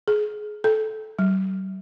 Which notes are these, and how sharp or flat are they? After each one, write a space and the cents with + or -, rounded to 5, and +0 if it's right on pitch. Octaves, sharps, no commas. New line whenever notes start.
G#4 +25
A4 -15
G3 -45